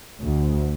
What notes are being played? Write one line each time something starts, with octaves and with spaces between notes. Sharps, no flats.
D2